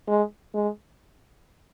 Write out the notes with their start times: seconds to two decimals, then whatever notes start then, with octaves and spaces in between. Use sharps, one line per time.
0.08 G#3
0.54 G#3